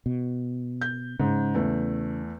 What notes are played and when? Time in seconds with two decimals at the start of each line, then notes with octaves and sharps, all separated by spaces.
0.06 B2
0.81 G6
1.20 G#2 C#3
1.55 E2 A3